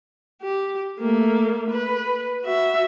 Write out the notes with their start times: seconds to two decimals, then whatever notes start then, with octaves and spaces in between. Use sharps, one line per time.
0.42 G4
0.99 A3 A#3
1.70 B4
2.45 F#4 E5